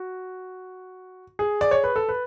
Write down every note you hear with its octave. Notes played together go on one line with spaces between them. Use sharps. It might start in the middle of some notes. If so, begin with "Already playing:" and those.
Already playing: F#4
G#4
D5
C#5
B4
A4
B4